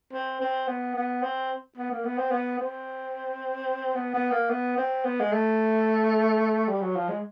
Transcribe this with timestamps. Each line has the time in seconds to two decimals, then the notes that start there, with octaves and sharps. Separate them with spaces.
0.13 C4
0.40 C4
0.68 B3
0.95 B3
1.22 C4
1.77 B3
1.91 A#3
2.05 B3
2.18 C4
2.31 B3
2.59 C4
3.95 B3
4.14 B3
4.31 A#3
4.50 B3
4.77 C4
5.05 B3
5.20 G#3
5.32 A3
6.68 G3
6.81 F#3
6.96 F3
7.09 G#3